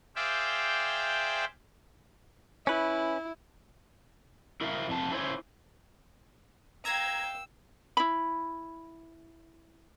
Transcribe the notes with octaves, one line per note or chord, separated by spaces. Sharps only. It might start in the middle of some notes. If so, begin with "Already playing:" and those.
G#4 C5 D5 E5 F5 G5
C#4 E4 B4
E4 A#4 E5 F5
F2 C3 A5
A3 C#4 E4 A4 C5 C#5
F5 G5 A#5 E6 G#6
E4 B5